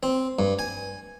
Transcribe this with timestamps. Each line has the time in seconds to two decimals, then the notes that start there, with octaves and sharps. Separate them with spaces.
0.03 C4
0.39 G2
0.59 G#5